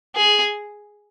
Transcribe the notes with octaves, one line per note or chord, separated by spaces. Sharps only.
G#4